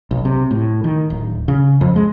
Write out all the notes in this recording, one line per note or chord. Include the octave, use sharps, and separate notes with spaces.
B1
C3
A2
D#3
D1
C#3
F2
G#3